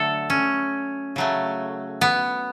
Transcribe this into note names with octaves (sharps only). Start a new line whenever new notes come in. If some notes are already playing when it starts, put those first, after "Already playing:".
Already playing: D3 F#3 A3 A4
C#4
C#3 F#3 A3
B3